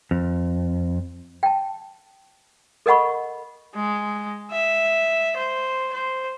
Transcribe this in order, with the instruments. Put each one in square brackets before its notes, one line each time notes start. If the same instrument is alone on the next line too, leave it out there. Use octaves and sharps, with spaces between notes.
[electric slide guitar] F2
[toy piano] G5 A5
A4 A#4 D#5 F#5 B5 C#6
[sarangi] G#3
E5
C5
C5